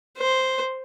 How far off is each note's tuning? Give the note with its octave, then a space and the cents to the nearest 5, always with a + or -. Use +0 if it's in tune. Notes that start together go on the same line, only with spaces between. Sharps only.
C5 +0